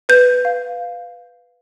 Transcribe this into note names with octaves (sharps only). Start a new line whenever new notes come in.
B4 G6
F5